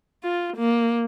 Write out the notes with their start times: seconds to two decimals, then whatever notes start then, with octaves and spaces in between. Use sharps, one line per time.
0.24 F4
0.57 A#3